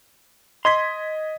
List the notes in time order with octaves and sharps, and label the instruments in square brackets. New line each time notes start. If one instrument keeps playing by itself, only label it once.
[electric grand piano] D#5 G#6 B6 [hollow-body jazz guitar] C6